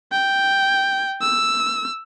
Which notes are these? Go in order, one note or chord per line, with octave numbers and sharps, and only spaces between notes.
G5
E6